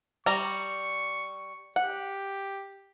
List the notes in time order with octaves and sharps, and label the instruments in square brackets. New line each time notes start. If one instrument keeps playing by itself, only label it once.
[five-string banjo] G3 A#5 [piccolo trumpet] C#6
[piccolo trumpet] G4 [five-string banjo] F#5